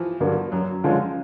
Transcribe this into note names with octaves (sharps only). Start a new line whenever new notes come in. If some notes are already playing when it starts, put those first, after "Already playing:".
Already playing: E3 F3
G2 D3 F#3 A#3
F#2 F#3
D3 F3 G#3 C#4